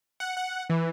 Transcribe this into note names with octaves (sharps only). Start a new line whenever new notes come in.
F#5
F#5
E3